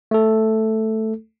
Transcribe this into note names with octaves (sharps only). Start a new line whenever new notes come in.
A3 A4